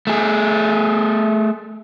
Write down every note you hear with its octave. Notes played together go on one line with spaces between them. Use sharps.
A3 G#4